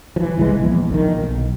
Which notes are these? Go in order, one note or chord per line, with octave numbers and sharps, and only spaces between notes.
E3 F3
G1 C2 E3 G#3
A#1 E2
A#1 D3 D#3
B1